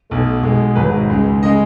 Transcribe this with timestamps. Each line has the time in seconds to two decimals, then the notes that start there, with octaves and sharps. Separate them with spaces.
0.10 B1 B2 A3
0.43 B1 B2 G#3
0.75 G#1 G#2 F#3 B4
1.10 C#2 C#3 G#3
1.43 C#3 G#3 D#5